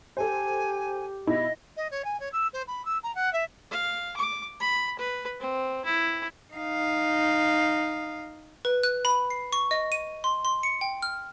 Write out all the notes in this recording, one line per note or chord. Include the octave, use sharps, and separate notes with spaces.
G4 A4 C5 G#5
B2 E4 D#5 B5
D#5
C#5
G#5
C#5
E6
C5
B5
E6
A#5
F#5
E5
F5
D6
B5
B4
C4
E4
D#4 F5
B4
F#6
B5
C7
C#6
D#5
D#7
C6
C6
C#7
G5
F6